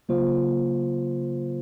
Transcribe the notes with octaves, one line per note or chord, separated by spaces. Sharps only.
C#3 F#3 A#3 F4 C5